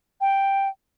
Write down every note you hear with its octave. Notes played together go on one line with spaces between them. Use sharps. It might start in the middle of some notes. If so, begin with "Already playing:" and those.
G5